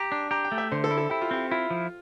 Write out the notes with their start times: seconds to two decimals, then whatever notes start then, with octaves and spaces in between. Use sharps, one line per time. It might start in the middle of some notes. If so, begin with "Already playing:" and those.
Already playing: G4 A#5
0.12 D4
0.31 G4 A#5
0.45 G5
0.52 A3
0.58 E5
0.72 D3 C5
0.84 A4
0.91 E4
0.98 A4
1.09 E4 G4
1.22 F4
1.31 C4 G4
1.51 E4 F4
1.70 F3